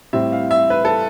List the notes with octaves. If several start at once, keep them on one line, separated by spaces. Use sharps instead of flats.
A2 G3 C4 E4 E5
F5
E5
B4
A4